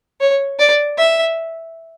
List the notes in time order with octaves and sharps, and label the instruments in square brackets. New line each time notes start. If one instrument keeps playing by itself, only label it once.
[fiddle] C#5
D5
E5